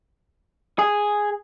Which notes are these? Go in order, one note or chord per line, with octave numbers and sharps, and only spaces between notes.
G#4